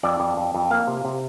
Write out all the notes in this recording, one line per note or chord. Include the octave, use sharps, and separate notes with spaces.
F2 D5
F2
F2
F2
A#3 F5
C3
C3